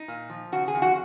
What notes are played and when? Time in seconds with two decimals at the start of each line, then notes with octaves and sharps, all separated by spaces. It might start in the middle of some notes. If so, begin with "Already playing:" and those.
Already playing: D#4
0.08 A#2
0.30 F3
0.52 C#3 F#4
0.68 G#4
0.75 F2
0.82 F#4